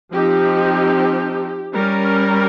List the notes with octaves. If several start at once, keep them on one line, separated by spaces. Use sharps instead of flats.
F3 C4 D#4 G4
G3 C#4 A#4